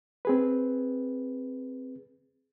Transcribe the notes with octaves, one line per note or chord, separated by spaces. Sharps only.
C4 G#4 B4